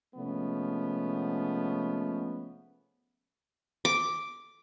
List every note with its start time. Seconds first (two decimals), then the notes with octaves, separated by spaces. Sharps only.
0.16 C3 F3 G#3 A3 B3 C#4
3.85 D6